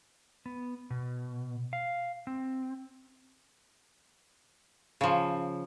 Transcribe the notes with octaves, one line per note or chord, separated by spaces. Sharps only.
B3
B2
F5
C4
C#3 F3